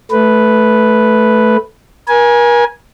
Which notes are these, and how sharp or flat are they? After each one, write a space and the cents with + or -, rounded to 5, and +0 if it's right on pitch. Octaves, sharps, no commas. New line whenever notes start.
A3 -10 B4 +0
A#4 +40 G#5 +0